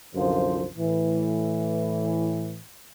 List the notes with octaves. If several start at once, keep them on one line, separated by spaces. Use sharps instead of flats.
C2 F#2 D3 F3 F4 C5
A2 E3